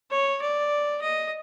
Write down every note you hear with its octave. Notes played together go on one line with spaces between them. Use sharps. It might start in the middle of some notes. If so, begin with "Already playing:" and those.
C#5
D5
D#5